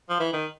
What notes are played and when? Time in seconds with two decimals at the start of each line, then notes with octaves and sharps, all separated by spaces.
0.09 F3
0.20 E3
0.33 D#3